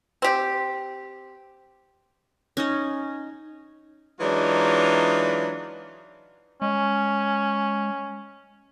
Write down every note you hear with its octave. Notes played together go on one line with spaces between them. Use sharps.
C4 G4
C#4 D#4 D#5
E3 F#3 G#3 D4 D#4 F4
G#3 C#4